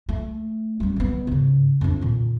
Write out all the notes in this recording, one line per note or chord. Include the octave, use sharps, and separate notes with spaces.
A3
G3 C#4
D#3 B3
G#2 C#3
F2 D4
A#2 D#3